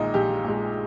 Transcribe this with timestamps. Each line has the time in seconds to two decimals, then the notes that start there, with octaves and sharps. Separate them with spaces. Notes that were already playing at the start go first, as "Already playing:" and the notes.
Already playing: A#1 A#2 G#3 D#4
0.14 A#1 G4
0.44 A#2 G#3